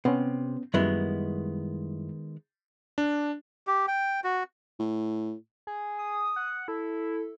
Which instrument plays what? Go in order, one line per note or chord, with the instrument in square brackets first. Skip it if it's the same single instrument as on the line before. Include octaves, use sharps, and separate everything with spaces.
[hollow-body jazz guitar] C3 [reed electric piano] B3 C#4
[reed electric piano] F#2 G3 E4 [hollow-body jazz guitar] D#3 G#3 B3
[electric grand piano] D4
[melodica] G4
G5
F#4
[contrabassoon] A2
[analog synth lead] G#4
[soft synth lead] D#6
[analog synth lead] F#5
[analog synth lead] E4 [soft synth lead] A4